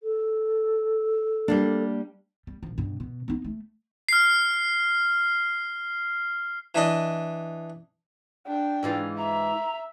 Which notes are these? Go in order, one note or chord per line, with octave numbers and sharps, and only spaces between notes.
A4
G3 A#3 D4
G3
A#1 F3
G2 B2
B2
B3 D#4
A3
F6 C7
E3 D4 D#5
D4 G5
G#2 E3 F4
E5 A#5